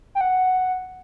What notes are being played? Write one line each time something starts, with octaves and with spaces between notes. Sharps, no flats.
G5
F#5